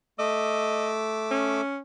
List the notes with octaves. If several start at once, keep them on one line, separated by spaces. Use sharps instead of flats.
A3 D#5 D6 E6
C#4